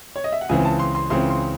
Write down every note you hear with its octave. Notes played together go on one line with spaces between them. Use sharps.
C#5
D#5
E5
F#5
C#2 C#3 E3 C4 G#5
A5
C6
C6
C#2 C#3 E3 C4 C6
C6